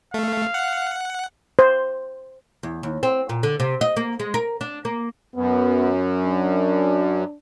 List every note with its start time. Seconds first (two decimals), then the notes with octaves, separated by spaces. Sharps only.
0.14 A3 F5
0.54 F#5
1.59 C5
2.63 E2
2.83 D#2
3.03 C4
3.29 A#2
3.43 D3
3.60 C3
3.81 D#5
3.96 A#3
4.19 G#3
4.34 A#4
4.61 D4
4.85 A#3
5.35 F#2 B3
6.23 D4